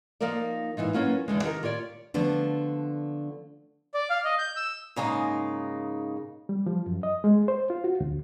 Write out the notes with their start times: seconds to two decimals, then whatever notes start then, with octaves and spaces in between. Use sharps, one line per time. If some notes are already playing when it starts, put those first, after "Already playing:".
0.21 F3 A#3 D#4 F4 A#4 D5
0.77 G#2 E3 D#4 F4
0.94 F#3 A#3 B3 C#4 F4
1.28 E2 D3 G#3
1.43 D#3 G4 A4 A#4
1.63 F4 G4 C#5 D5
2.14 D3 F3 A3 B3 D4
3.94 D5
4.10 F5
4.25 D#5
4.39 G6
4.56 E6
4.96 G#2 C#3 A#3 D#4
6.49 G3
6.66 F3
6.86 F#2
7.03 D#5
7.24 G#3
7.48 C5
7.70 F4
7.84 F#4
8.00 D2